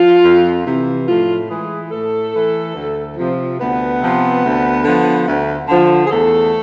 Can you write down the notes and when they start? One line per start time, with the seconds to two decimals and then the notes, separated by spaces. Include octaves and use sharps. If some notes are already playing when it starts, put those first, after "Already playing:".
Already playing: F3 F4
0.24 F2
0.66 C3 E3
1.07 A2 F3 F4
1.49 E3 G#3 G#4
1.91 A2 A3 A4
2.33 E3
2.75 D2
3.17 C3 F3
3.58 D2 B3 B4
4.01 C3 F3
4.43 D2
4.84 D3 F3
5.26 D2
5.68 D3 F3
6.06 G#4
6.10 E2 A3 A4